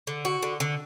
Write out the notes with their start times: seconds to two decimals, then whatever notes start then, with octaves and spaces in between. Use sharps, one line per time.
0.07 D3
0.25 F#4
0.43 D3
0.60 D3